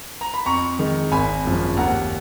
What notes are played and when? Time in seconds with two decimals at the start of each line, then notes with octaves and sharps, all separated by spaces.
0.21 A#5
0.34 B5
0.46 F2 A#5 C#6
0.79 D#3 G#3
1.12 G#1 G#5 B5
1.44 F#2 F3 G#3
1.77 D#2 F#5 A#5